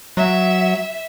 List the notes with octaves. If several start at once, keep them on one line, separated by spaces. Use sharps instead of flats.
F#3 E5